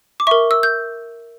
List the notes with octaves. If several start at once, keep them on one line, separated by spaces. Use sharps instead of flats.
D6
A#4 E5 C#6
E6
G6